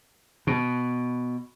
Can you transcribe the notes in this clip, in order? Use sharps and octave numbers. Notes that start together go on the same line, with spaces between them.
B2